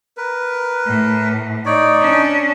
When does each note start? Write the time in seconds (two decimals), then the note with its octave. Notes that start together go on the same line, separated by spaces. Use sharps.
0.17 A#4 B4
0.86 A2
1.65 D#4 C#5 D5
1.99 C#4 D4